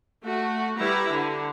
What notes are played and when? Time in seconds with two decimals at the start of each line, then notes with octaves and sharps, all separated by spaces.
0.24 A3 F#4
0.79 G3 E4 B4 A#5
1.12 D3